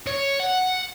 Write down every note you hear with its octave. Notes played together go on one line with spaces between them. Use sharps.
C#5
F#5